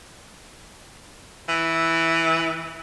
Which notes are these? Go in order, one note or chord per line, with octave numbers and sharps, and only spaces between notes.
E3